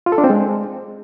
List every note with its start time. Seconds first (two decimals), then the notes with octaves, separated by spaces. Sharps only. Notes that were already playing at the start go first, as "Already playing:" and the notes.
0.06 F4
0.12 A4
0.18 D4
0.24 C4
0.30 G#3